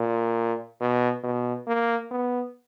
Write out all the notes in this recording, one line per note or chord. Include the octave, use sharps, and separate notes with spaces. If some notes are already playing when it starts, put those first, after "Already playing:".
Already playing: A#2
B2
B2
A#3
B3